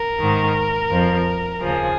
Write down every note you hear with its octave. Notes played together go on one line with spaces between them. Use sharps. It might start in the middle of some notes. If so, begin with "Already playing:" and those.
Already playing: A#4
G#2 D#3
F2 F3
D#2 C#3 F3 G#4